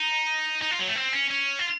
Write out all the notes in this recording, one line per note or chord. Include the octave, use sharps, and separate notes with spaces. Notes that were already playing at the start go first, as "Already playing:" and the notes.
Already playing: D#4
D#4
F4
F#3
A3
C4
C#4
C#4
F4